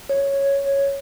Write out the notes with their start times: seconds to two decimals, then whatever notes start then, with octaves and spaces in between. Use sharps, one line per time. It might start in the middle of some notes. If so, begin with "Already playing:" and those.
0.09 C#5